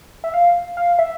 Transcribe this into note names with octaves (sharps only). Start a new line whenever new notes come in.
E5
F5
F5
E5